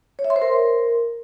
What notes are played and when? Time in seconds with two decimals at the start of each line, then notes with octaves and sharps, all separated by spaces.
0.19 C#5
0.24 E5
0.30 C6
0.36 C5
0.42 A#4